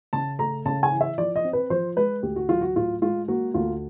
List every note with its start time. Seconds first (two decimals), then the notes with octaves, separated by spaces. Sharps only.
0.13 C#3 A5
0.39 A3 A#5
0.66 C#3 A5
0.83 G#5
0.92 E3
1.01 E5
1.18 F3 D5
1.36 D#5
1.45 C4
1.53 B4
1.70 F3 C5
1.97 G#3 B4
2.23 D2 G4
2.36 F#4
2.49 F#3 F4
2.61 F#4
2.76 A2 F4
3.02 G#3 F4
3.28 A#3 F#4
3.54 D2 F4